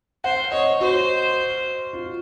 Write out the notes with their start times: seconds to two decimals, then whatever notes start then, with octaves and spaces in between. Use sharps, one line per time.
0.24 C5 F#5
0.52 C#5 D#5
0.81 F#4 C5
1.93 F4